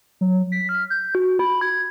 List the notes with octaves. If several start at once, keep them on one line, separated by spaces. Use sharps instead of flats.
F#3
B6
F6
G6
F#4
B5
G#6